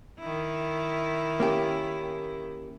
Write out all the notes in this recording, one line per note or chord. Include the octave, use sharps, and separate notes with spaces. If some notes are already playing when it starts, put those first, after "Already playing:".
D#3 E4
A#3 C#4 G4